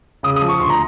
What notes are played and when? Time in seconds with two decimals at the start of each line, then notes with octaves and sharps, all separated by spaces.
0.23 C#3 D#6
0.36 D#6
0.41 F3
0.49 C#6
0.60 D2 C6
0.70 A#5